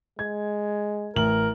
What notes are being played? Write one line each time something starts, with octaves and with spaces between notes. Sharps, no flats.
G#3 G#6
A1 A#4 F#7